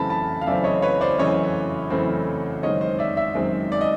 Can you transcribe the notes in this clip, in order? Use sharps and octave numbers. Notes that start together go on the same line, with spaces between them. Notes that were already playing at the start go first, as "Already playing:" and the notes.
Already playing: F#2 C#3 E3 A3 C4 A5 B5
A5 B5
F5
F#2 C#3 E3 A3 C4 D5 E5
C#5 D#5
B4 C#5
C5 D5
F#2 C#3 E3 A3 C4 C#5 D#5
F#2 C#3 E3 A3 C4
F#2 D#3 G#3 C4 C#5 D#5
C5
D5 E5
D5 E5
F#2 D#3 G#3 C4
D5
D#5